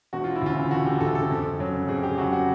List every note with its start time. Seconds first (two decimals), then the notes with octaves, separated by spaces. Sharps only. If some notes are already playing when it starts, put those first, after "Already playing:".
0.13 E1 F#4
0.24 F4
0.35 E4
0.42 D2 C#3 F4
0.71 E1 F#4
0.86 G4
1.00 D2 C#3 A4
1.15 A4
1.30 F2
1.59 C#3 F#3
1.88 F2 G#4
2.03 G4
2.18 F#3 F#4
2.21 C#3
2.33 F#4